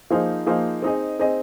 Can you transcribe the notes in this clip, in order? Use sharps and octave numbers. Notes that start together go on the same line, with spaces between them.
F3 A#3 D#4 G#4 C5
F3 A#3 D#4 G#4 C5
C4 D#4 G#4 D#5
C4 D#4 G#4 D#5